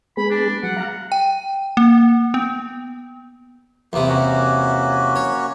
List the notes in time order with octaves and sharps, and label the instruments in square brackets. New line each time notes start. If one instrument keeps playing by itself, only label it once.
[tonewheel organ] G#3 B3 G#4 [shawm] B5
[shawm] D4
[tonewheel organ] F#3 [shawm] F#5
[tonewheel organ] F5 A#5
[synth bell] G5
A#3
B3
[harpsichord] E2 C3 [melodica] A#3 B3
[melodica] A#3 C#4 F#4
[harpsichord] C#5